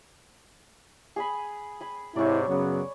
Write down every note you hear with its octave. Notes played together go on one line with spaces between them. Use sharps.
G#4 G#5 B5
G#5 B5
G#2 C3 E4 C#5 D5
F#2 C#3 F#3 B3